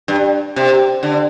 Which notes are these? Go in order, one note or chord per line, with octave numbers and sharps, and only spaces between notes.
G2
C3
D3